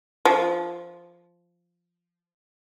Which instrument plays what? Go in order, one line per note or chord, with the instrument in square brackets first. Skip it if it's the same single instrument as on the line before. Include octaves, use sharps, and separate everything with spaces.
[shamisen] F3